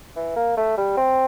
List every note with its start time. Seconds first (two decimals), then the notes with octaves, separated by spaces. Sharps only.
0.16 E3
0.37 A#3
0.57 A3
0.78 G3
0.97 C4